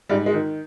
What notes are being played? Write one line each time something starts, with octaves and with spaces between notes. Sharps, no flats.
G#2 G3
G#3
D#3